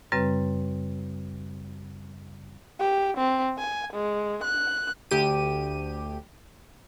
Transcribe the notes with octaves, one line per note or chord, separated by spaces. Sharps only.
F#2 C#3 G3 C4 B4
G4
C4
G#5
G#3
F#6
D2 G4 D#7